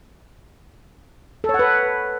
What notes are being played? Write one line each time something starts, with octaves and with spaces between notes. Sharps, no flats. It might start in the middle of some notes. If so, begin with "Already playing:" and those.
A4
C#5
F#5
B4